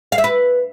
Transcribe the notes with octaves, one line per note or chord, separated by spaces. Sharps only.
F5
E5
B4